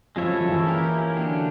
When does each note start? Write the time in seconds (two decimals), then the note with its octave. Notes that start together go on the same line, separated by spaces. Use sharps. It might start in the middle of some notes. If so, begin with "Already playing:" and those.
0.16 F3 G#3 C#4 E4 A4 C#5
0.34 F3
0.49 E3
0.66 A#3 C#4 E4 G4 A#4
1.16 D3 F#3 A#3 D4 G4